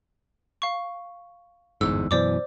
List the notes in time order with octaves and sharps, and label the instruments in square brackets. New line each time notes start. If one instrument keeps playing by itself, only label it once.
[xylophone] F5 C#6
[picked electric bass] G1 E2 G#2 [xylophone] E6
[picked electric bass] F#2 B2 E3 [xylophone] C5 D5 D6